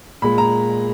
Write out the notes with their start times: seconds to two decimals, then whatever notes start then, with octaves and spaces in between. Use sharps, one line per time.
0.22 A#2 G#3 B5
0.38 A#5